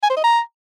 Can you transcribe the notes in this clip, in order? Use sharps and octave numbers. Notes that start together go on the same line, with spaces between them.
G#5
C5
D#5
A#5